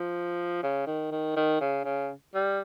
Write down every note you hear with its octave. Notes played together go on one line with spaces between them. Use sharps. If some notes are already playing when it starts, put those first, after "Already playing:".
Already playing: F3
C#3
D#3
D#3
D#3
C#3
C#3
G3